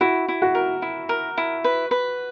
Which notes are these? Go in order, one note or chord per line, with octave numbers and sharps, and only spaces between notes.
E4 F#4
E4
F#4
A#4
E4
A#4
E4
B4
B4